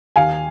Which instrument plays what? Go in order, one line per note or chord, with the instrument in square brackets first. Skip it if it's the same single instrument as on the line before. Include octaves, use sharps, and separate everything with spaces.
[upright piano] D#2 F5 G#5